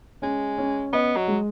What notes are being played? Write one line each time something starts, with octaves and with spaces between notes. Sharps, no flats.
G#3 C#4
C#4
B3 D#5
F#3
G#3